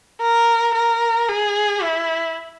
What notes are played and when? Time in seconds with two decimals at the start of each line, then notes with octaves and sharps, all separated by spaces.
0.21 A#4
0.75 A#4
1.28 G#4
1.82 E4